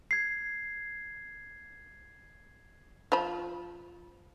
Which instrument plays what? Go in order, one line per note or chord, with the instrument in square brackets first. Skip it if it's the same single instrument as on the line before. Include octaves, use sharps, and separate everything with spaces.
[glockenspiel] G#6 C7
[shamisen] F3 B5